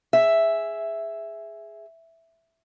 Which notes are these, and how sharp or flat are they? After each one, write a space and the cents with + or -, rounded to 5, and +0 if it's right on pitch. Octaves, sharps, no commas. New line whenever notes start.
G#4 +0 E5 +0